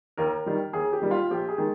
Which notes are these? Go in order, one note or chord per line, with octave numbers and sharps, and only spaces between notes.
D#2 A#4
D#3 G3
D#2 G#4
G4
D#3 G3
F4
A#1 G4
G#4
D#3 G#3